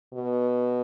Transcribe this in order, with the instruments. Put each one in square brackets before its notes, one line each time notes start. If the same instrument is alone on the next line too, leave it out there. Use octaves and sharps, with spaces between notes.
[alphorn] B2